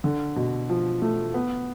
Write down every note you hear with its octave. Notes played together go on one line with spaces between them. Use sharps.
D3
B2
F3
A3
B3